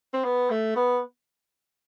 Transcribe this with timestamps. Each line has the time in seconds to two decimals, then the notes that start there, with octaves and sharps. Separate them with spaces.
0.13 C4
0.25 B3
0.50 A3
0.76 B3